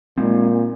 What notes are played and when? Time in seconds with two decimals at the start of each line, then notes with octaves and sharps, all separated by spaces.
0.18 A#2 G#3 C4